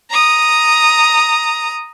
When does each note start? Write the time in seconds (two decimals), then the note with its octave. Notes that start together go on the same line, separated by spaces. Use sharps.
0.10 A#5 D#6